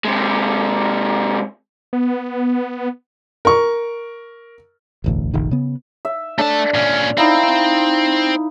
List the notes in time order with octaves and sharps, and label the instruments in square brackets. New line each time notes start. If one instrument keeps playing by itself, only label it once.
[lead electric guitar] C3 G#3
[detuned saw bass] B3
[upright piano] A#4 C#6
[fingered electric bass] E1 A1 D2
F1 A#1 D#3
C#3 B3
[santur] E5
[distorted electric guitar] A3 A5 [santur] D4 A4
[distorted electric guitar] A#2 C#4
[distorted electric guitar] C4 [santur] D#4 E4 F5